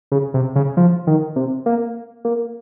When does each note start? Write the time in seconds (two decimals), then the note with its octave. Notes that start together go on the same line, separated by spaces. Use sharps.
0.12 C#3
0.34 C3
0.56 C#3
0.77 F3
1.07 D#3
1.36 C3
1.66 A#3
2.25 A#3